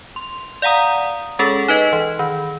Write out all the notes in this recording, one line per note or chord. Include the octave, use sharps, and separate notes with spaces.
C6
D5 F5 F#5 A#5 D#6
G#3 C#4 G#4 A4 C#6 A6
D#4 B4 D#5
E3
D#3